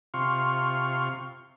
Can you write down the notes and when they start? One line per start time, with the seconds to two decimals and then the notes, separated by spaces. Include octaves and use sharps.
0.14 C3 F4 C6 C#6 F6